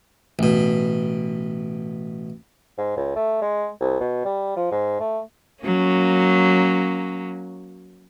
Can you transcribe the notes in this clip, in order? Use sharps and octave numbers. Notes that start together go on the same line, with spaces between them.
A1 B2
G#2
C#2
A3
G#3
C2
B2
G3
F3
G#2
A3
F#3 A#3 C#4